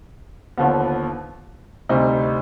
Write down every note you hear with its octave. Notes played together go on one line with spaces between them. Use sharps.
D#2 D3 F3 B3
D2 C3 G3 C4 D#4